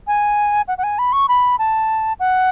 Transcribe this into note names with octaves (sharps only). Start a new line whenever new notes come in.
G#5
F#5
F#5
G#5
B5
C#6
B5
A5
F#5